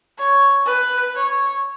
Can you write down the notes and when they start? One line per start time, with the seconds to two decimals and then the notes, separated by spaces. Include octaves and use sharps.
0.18 C#5
0.66 B4
1.14 C#5